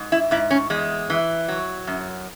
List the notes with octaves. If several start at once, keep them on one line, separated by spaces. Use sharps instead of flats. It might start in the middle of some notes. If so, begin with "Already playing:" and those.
Already playing: G#2
E4
G#2 E4
C#4
E2 G#3
E3
F#3
F#2